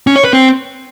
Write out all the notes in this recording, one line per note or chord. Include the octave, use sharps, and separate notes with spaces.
C#4
C#5
B4
C4